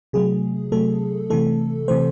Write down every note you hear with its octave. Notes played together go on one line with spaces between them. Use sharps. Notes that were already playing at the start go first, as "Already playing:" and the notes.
C3 F#3 A3 G#4
C3 F#3 A3 A4
C3 E3 A3 A4
C3 E3 A3 C5